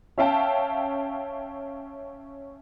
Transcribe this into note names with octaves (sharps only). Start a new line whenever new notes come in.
C#4 E5 F5 G5 A5